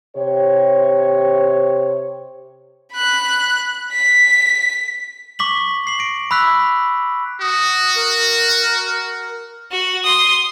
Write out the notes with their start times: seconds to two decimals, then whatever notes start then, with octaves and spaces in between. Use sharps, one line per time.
0.16 C3 G4 C5 C#5
2.93 B5 F#6
3.92 B6
5.39 C#6 D6 B6 F#7
5.87 C7 F#7
5.99 A#6 D7
6.31 B5 E6 F#6 B6
7.41 F#4 D#6
7.95 A#4
9.71 F#4
10.03 C6 D#6